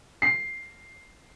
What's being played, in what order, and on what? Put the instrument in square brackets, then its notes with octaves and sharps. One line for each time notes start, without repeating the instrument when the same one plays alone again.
[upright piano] C7